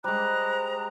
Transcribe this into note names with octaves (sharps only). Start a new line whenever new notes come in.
G3 G#3 C5 A#5 F#6